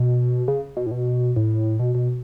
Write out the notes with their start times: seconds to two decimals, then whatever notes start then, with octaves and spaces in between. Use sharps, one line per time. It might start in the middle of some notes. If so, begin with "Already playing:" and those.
Already playing: B2
0.48 C#3
0.77 B2
0.86 A2
0.91 B2
1.36 A2
1.79 B2
1.95 B2